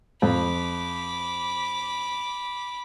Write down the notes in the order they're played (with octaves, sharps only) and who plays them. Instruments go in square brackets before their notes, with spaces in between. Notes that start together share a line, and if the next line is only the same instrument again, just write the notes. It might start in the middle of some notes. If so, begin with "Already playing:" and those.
[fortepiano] F2 [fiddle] B5 D6